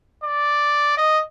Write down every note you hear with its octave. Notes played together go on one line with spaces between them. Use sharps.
D5
D#5